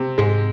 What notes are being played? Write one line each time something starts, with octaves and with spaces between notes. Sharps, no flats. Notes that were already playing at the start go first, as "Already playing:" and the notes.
Already playing: C3
G#2 G#3